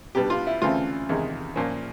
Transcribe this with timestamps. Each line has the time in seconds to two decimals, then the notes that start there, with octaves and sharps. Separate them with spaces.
0.15 B2 G3 B3 D4 G4
0.30 F4
0.47 E4
0.62 D2 C#3 E3 A3 C4 F4
1.09 E2 C3 D#3 G#3
1.56 A#2 F3 A#3 C#4